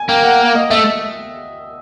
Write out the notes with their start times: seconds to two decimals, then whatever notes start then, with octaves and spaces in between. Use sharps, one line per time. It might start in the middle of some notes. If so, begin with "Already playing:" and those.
Already playing: G#5
0.09 A#3 G5
0.24 F#5
0.40 F5
0.55 D#5
0.70 A3 E5